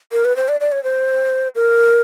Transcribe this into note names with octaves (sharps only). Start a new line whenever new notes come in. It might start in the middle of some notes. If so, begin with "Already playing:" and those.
A#4
B4
C5
D5
D5
C#5
C5
A#4